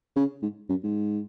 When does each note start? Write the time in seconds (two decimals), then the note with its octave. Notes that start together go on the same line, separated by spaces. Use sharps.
0.16 C#3
0.42 G#2
0.69 F#2
0.83 G#2